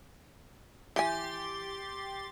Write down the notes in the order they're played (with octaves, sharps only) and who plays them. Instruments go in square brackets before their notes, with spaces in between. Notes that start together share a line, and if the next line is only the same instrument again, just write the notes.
[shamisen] E3 G#5 [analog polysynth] G4 C6 A6